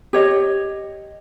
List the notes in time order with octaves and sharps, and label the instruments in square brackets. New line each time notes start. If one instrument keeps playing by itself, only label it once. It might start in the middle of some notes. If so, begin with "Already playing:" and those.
[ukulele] G4 C#5 D#5